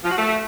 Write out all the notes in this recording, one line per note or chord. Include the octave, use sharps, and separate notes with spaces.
F3
F#4
A3